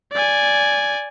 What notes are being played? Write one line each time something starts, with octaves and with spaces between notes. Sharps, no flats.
D5 G#5